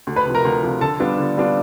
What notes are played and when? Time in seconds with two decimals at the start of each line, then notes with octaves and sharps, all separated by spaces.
0.07 D2
0.16 B4 B5
0.26 C3 F3
0.35 A#4 A#5
0.45 D2
0.63 C3 F3
0.81 D3 A4 A5
1.00 G3 B3 D4 F4
1.18 D3
1.37 G3 B3 D4 F4